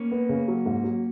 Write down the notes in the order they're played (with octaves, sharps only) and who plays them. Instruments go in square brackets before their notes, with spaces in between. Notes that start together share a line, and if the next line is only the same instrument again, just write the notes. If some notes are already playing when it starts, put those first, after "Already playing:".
Already playing: [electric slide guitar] A#3 C#4
[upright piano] B3
C#3
F#3
G#2
F#3